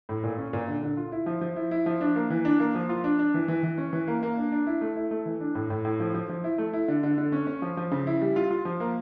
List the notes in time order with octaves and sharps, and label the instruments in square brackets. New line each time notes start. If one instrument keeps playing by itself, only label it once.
[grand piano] A2
A#2
C#4
A#2
D3
D3
F4
E4
F3
F3
E4
E4
F3
D4
A#3
E3
D4
A#3
F3
F4
D4
D4
E3
E3
E3
C#4
E3
A#3
A#3
D4
D4
E4
A3
E4
A3
E3
D4
A2
A2
A2
F3
F3
F3
E4
A3
E4
D3
D3
D3
C#4
C#4
F3
F3
C#3
E4
G3
F4
F4
F3
A#3